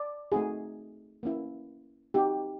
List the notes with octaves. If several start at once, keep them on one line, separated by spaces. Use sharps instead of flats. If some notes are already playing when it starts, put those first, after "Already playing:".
Already playing: D5
A3 C4 D#4 F#4 G#4
A#3 C#4 E4
C4 D#4 F#4 G4